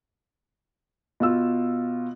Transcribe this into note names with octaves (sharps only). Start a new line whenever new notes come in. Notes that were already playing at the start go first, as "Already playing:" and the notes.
B2 F4 E6